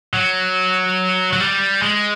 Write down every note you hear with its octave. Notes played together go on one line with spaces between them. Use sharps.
F#3
F#3
G3
G#3